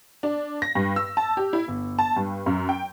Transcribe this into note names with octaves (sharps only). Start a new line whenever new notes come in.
D4
A#6
G2
E6
A5
G4
E4
G1
A5
G2
F#2
G5